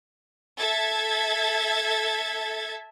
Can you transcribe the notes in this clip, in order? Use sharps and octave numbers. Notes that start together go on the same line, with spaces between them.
A4 E5 G#6 A6